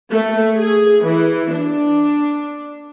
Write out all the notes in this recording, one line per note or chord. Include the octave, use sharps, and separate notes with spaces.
A3
G#4
E3
D4